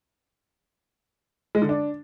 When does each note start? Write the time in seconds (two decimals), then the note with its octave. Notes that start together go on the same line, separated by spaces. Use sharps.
1.55 G#3
1.62 D3
1.69 D4